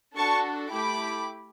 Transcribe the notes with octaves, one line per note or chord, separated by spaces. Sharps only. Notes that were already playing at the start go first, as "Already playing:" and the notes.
D4 F#4 A4 A5 C#6
A3 E4 G4 B5 D6